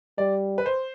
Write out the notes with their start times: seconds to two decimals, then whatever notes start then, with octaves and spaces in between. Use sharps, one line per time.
0.18 G3 D5
0.58 B4
0.66 C5